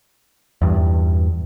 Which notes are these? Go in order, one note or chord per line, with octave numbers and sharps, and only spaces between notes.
E2 G2